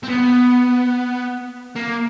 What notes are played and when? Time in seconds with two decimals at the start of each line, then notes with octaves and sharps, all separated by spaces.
0.03 C4
0.08 B3
1.76 A#3